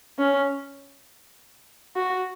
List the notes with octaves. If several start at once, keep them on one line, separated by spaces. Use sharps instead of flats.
C#4
F#4